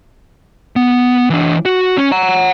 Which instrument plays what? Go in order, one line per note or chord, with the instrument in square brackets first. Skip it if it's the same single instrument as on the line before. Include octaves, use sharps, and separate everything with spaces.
[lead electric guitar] B3
E3 D4
F#4
C#4
F#5 A#5